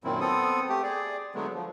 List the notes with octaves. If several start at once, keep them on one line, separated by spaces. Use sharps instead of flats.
F#2 A#2 D#3 F#3 C4 E4
B3 C4 A4 D#6
A3 G4
G#4 D5
D3 F#3 G#3 A3 B3
F3